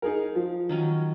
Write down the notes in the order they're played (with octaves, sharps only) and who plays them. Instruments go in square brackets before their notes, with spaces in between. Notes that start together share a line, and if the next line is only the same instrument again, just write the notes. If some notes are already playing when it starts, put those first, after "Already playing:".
[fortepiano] D#4 G#4 A#4
F3
[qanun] D#3 F#3 C#4